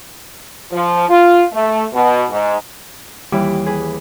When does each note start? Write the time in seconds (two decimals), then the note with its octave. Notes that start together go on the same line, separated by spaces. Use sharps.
0.72 F3
1.08 F4
1.53 A3
1.93 B2
2.30 G#2
3.32 D#2 E3 G3 E4 D6
3.66 G#4 B4